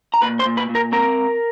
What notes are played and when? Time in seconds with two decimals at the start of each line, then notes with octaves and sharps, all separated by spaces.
0.14 A#5
0.22 A#2 B4 B5
0.39 C5 C6
0.45 A#2
0.57 B4 B5
0.69 A#2
0.75 A#4 A#5
0.92 C4 A#4 A#5